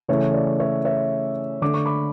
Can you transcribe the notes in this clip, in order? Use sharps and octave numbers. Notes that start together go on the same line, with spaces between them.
C#3 E3 A3 C#5
D5
C#5 E5
C#5 E5
D3 A3 D6
C#6
B5 D6